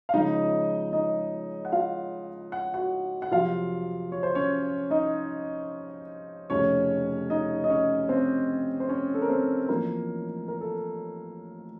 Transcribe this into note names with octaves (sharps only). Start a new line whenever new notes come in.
F5
C#2 C#3 F3 D#4 D#5
D#4 D#5
F#5
F4 F5
F#5
F#4 F#5
F#5
F2 C3 F#3 F4 F5
C#5
C5
C#4 C#5
D#4 D#5
F1 F2 C#3 C#4 C#5
D#4 D#5
D#5
C#4 C#5
C4 C5
C5
C#4 C#5
A4
A#4
C4 C5
A1 A2 F3 A#3 A#4
A#4
A4